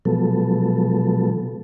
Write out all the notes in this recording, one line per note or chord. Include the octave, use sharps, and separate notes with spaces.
B2 F3 F#3 G#3 B3 A4